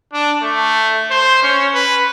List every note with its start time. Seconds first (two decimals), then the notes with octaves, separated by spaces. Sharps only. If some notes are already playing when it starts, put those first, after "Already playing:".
0.13 D4
0.42 A3
1.11 C5
1.43 C#4
1.74 B4